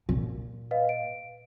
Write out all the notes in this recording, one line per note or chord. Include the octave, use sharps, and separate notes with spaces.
A#2
B4 D#5 F5
D7